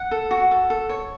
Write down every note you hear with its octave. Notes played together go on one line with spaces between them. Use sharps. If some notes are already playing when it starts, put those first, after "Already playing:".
Already playing: F#5
A4
F#4
A4
A4
C#5